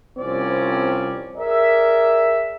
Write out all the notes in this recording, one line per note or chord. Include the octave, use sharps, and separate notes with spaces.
C2 F3 C4 C#4 D5
G#4 A#4 D5 E5